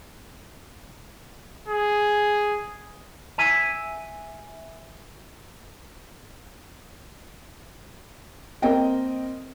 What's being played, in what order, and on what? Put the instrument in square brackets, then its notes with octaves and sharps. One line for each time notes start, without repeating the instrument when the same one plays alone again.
[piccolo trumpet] G#4
[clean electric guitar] E5 G#5
[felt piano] A#3 C4 A#4 D#5 G5